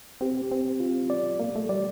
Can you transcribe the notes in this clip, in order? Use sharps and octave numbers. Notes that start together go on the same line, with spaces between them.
C4 G4
C4
F4
D5
A#3
A3
G3 D5